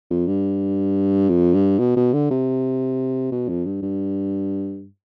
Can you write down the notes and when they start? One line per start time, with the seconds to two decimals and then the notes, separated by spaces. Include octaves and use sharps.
0.11 F2
0.27 G2
1.29 F2
1.54 G2
1.79 B2
1.96 B2
2.13 D3
2.31 C3
3.32 B2
3.49 F2
3.66 G2
3.82 G2